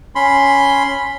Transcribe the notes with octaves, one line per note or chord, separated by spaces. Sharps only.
C#4 B5 C6